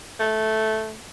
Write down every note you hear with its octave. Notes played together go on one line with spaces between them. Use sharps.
A3